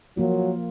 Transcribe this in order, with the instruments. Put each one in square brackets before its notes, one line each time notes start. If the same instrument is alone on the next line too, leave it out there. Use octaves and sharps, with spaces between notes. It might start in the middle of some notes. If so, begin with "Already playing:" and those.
[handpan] F3 A#3 F4 [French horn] F#3